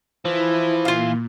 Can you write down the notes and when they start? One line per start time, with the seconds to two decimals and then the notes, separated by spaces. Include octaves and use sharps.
0.25 E3 F3 E4
0.85 A#2 F4 F5